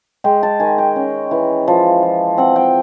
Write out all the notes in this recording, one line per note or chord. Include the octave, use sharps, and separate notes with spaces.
G#3 G5
A5
D#3 G#5
G5
C#4
E3
F3
F3
C4 F#5
G5